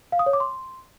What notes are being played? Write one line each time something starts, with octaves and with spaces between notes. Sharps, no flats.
F5
D#6
C#5
D6
C6